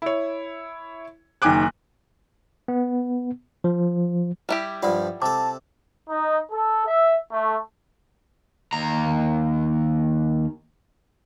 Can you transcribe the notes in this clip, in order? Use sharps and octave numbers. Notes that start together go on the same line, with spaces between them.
E4 C#5
F#1 D#3 G5 G#5 D6 F#6
B3
F3
G3 E4 G4
G2 F3 F4 D5 F5 F#5
C3 A4 A5 D6
D#4
A4
E5
A3
D#2 A#5